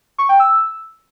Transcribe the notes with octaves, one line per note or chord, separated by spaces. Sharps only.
C#6
G5
E6